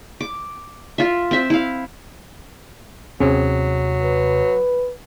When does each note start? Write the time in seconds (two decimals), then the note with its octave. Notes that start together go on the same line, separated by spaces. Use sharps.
0.21 D6
0.98 F4 E5
1.31 C4 E5
1.50 E4 F5
3.20 D#2 C3 F#3 C4 C#4 G#4
4.03 B4